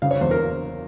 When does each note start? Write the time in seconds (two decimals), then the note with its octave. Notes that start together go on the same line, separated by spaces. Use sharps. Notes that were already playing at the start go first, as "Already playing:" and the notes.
0.02 C#3 F5
0.11 C#5
0.21 E2 C5
0.31 A#4